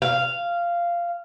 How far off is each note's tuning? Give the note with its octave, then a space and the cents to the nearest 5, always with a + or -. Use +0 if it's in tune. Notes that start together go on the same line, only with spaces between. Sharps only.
F5 -10